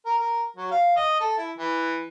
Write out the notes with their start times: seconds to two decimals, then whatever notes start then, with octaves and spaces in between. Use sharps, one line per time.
0.06 A#4
0.19 A#4
0.57 F#3
0.71 F5
0.96 D#5
1.20 A4
1.38 E4
1.57 E3